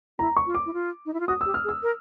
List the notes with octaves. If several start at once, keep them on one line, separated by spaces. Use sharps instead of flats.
E4 A#5
C#6
F4
D6
E4
F4
D#4
E4
F4
F#4 D#6
E6
G4
F6
G#4
E6
A#4